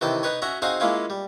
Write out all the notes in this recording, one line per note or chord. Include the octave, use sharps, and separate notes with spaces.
C3 D#3 E3 G5 A5
D#4 B4 C#5
C#4 F#4 E5 A#5
C4 D#4 F#4 G#4 F5 G#5
G#3 A#3 C#4 E4 F4
G3